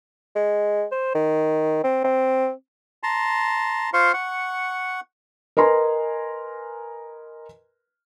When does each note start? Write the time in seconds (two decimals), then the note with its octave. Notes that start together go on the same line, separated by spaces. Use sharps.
0.35 G#3
0.92 C5
1.15 D#3
1.84 C4
2.04 C4
3.03 A5 A#5 C6
3.93 F4 C5 F5 C6 C#6
4.13 F#5 C#6
5.57 A#4 B4 D#5 G#5 A#5 C6